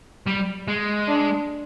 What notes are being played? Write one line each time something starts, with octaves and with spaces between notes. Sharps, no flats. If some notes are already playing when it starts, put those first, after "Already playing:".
G3
G#3
D4